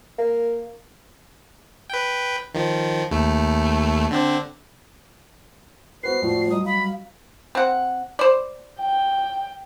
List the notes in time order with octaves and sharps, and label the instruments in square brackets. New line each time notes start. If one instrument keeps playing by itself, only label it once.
[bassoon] A#3
[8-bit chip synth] B4 G5
D#3 F3
D#2 A3
D3 C4 D4
[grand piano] B3 F#4 B4 [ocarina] C5 [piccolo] C7
[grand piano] A2 F3 F#4 [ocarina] F4 [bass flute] D5
[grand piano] F#3 D#5 A#5 [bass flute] G3 [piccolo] D#6
[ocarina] F5 [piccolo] B5
[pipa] C4 F#5
C5 D5
[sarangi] G5